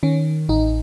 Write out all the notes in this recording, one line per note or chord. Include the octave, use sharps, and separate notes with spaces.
D#3 C#4
A1 D#4